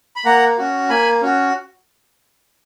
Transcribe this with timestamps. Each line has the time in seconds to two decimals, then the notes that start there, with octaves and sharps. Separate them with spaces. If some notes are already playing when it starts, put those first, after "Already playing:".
0.16 B5
0.25 A#3 F#5 A#5
0.58 C#4 F#4
0.89 A#3 G#5 B5
1.22 C#4 F#4